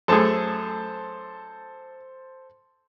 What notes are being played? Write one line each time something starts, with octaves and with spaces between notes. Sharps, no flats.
F#2 A3 G#4 A4 C5 A5